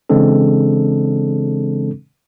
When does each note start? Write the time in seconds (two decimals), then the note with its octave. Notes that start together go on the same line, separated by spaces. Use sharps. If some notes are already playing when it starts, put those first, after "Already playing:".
0.10 C#3 E3 G#3 C4 D4 A4